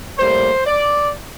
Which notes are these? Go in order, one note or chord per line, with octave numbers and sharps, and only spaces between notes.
A2 G3 A#3 C5
D5